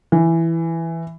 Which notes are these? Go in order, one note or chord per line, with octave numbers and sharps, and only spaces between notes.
E3